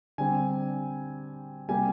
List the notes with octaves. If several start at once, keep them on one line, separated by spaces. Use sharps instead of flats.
D3 G3 C4 G#5
C3 G3 A#3 G#5